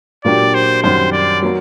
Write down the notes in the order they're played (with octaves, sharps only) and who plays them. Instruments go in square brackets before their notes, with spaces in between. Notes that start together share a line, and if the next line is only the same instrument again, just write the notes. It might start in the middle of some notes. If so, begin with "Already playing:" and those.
[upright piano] A#2 F#3 A#3 D4 G4 [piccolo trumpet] D5
[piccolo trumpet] C5
[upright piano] F#2 D#3 G3 [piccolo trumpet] C5
[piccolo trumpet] D5
[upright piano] F#3 A#3